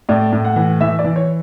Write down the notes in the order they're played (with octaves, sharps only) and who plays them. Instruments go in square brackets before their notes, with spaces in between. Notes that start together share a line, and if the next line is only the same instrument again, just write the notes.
[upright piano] A2 D5
A2
F#5
E3
E3 E5
D5
E3
C#5